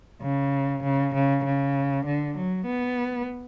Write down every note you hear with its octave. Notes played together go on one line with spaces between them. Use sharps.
C#3
C#3
C#3
C#3
D3
F#3
B3